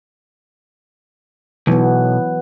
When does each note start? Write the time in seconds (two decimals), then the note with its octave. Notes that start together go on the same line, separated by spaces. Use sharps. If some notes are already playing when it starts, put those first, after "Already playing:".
1.67 B1 E3 F#3 B3